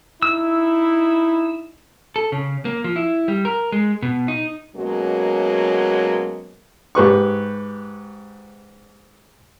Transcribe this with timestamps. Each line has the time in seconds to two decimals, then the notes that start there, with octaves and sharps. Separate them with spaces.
0.22 D#4 E4 E6
2.16 A4
2.32 C#3
2.65 A#3
2.84 F3
2.96 E4
3.28 G3
3.45 A#4
3.72 G#3
4.02 B2
4.28 D#4
4.76 B2 F#3 G#3 A#3 C#4
6.95 G#2 G4 B4 C#6